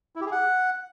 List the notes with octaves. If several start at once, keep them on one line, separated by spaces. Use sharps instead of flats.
E4
G4
G#4
F#5